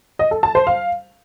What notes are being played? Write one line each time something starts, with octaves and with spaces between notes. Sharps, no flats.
D#5
A4
A5
C5
F5